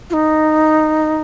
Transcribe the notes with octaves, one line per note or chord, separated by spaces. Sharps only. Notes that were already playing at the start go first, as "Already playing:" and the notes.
F4
D#4